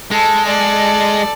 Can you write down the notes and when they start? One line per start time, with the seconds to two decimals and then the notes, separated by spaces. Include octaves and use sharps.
0.12 G#3 A4
0.44 A4 D5